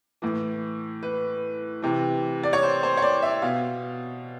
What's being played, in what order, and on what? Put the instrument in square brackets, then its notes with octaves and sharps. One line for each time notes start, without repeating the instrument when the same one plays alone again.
[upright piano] A2 E3
B4
C3 E3
D5
C#5
C5
C5
C#5
D5
E5
B2 F5